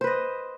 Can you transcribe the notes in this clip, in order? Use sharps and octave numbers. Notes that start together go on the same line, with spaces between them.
B4 C5 D#5